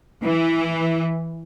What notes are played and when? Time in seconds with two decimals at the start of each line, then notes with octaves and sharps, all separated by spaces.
0.22 E3